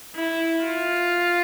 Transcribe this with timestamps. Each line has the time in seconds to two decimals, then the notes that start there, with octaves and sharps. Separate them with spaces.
0.15 E4
0.63 F4